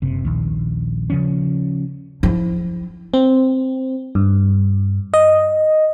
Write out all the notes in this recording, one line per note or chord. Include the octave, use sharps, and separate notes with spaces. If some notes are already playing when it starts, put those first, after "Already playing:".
F#1 C3
A#1 D#2
C#3 F3 C#4
F3 E4
C4
G2
D#5